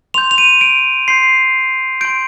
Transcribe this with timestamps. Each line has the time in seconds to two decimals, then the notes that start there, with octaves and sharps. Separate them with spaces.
0.14 C6 G6 F7
0.31 F7
0.38 D#7
0.61 D7
1.08 C6 G6 C7
2.01 C6 G6 D7